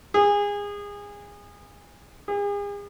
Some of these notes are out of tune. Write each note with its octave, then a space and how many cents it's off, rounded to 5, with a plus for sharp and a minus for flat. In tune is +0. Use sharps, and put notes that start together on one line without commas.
G#4 -25
G#4 -40